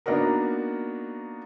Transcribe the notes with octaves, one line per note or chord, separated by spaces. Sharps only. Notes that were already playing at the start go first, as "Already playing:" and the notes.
A#3 B3 D4 D#4 F#4 A#4